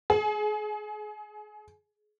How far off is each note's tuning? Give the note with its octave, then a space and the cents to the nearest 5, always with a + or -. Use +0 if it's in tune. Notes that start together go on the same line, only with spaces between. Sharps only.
G#4 +30